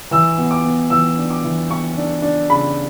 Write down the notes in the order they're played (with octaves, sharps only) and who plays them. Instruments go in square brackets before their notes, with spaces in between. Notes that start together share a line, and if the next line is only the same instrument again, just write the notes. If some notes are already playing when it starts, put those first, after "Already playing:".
[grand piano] E3 E6
B3
D6
B3
E3 E6
D4
D6
E3
B3 C#6
D4
D4
C#3 B5